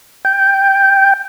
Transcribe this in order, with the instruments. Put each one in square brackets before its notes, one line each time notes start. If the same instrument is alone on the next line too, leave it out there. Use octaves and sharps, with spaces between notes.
[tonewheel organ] G5